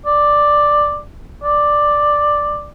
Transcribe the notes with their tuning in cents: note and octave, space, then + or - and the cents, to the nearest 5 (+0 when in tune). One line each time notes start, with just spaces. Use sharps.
D5 +5
D5 +5